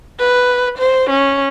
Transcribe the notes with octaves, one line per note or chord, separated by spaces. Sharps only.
B4
C5
C#4